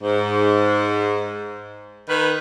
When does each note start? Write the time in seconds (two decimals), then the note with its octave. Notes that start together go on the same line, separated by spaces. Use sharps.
0.01 G#2
2.09 D#3 B4